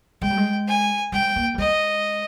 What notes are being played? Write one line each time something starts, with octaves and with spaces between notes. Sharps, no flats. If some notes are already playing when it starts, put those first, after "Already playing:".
G#3 G5
G3
G#3
G#5
G#3 G5
A#3
G3
G#3 D#5